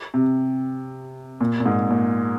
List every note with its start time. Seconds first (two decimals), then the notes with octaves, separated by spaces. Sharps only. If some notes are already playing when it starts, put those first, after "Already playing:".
0.14 C3
1.41 A#2
1.60 A#2
1.65 G#2
1.90 A#2